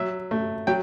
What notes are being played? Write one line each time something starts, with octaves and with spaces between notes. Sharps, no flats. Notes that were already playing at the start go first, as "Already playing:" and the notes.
Already playing: F#3 E5
A3
F#3 G5